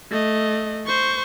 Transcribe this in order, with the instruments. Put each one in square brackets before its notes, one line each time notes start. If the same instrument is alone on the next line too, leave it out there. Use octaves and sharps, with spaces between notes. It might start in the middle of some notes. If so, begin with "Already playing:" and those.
[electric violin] A3 D#5
C5 C#6